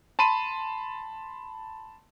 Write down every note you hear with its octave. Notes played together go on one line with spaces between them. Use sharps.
A5 B5 C6 D#7